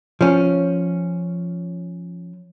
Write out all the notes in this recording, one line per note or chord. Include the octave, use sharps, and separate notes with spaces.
F3 C#4